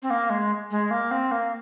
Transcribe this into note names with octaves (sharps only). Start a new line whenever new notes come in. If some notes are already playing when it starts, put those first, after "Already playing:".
C4
A#3
G#3
G#3
A#3
C4
A#3